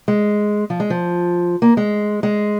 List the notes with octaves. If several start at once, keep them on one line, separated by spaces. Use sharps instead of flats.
G#3
F3
G#3
F3
A#3
G#3
G#3